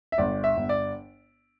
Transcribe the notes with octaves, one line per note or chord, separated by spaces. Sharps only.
E5
G1 D5
E5
G1
D5